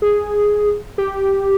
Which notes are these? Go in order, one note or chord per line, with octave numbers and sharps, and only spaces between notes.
G#4
G4